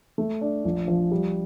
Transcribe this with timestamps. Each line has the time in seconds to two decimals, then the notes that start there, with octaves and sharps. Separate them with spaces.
0.18 A3
0.41 D4
0.65 A#1
0.88 F3
1.11 G3